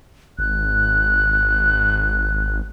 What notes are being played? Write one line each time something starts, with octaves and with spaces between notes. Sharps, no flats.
G#1 F#6